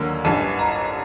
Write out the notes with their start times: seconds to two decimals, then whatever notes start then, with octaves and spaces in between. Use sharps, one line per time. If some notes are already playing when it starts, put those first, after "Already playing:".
Already playing: D#2 D3 F#3 A#3
0.24 A1 G2 E3 A5
0.59 A#5